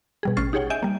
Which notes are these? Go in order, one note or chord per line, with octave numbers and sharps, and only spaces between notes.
B2 G3 G#4
A1 C#4 C#6 F6 A6 C7
D#4 G4 G#4 C#5 F#5 G5
D#5 E5 G#5 G6 D7
G3 A#3